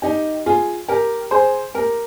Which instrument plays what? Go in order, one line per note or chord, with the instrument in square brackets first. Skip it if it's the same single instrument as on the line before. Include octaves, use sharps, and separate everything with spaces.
[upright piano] D#4 G4
F4 G#4
G4 A#4
G#4 C5
G4 A#4